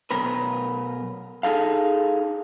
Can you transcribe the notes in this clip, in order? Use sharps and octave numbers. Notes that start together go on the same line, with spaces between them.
B1 B3 A#4 B4
D#4 G#4 A4 F5